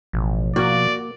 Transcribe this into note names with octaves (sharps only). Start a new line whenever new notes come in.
A1 B2 F3
A#3 F#4 D5